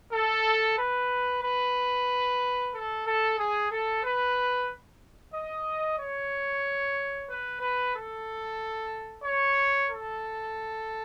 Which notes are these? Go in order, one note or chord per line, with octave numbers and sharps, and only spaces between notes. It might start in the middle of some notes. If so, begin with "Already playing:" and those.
A4
B4
B4
A4
A4
G#4
A4
B4
D#5
C#5
B4
B4
A4
C#5
A4